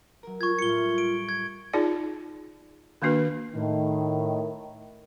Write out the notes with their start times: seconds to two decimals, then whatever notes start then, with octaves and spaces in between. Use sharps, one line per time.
0.23 F#3 A#4
0.41 F4 C#6 G#6
0.59 A2 G3 F4 C#7 G7
0.98 D7
1.29 G#6
1.73 D#4 F4 G#4 D5
3.02 D#3 A#3 D4 F#4 B4
3.54 A2 D#3